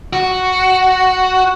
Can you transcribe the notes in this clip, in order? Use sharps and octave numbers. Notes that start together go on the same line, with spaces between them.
F#4